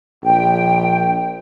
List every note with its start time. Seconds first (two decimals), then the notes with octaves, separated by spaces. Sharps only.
0.23 A#1 G5